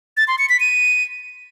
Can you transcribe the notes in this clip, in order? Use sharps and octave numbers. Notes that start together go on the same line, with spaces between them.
A6
C6
C#7
B6
D#7